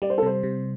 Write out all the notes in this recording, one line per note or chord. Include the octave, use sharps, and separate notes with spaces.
G3 D5
C5
A4
C3 C5
C3